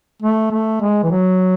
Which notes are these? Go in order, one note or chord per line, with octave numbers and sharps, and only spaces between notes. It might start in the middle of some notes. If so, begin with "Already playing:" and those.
A3
A3
G#3
E3
F#3